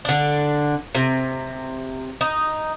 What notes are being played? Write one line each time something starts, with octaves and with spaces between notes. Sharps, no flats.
D3 D4
C3
D#4